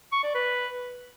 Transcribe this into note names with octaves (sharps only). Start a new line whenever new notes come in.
C#6
D5
B4